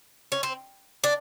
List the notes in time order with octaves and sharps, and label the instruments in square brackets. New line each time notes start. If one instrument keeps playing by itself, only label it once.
[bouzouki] C#4
C4
D4